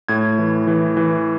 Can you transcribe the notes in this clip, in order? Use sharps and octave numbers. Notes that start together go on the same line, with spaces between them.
A2 G#6
E3
E3
E3